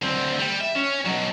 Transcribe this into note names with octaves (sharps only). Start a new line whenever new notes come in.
D2 C4
G3
E5
C#4
B2 F#3